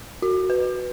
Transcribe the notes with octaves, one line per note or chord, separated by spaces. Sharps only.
F#4
B4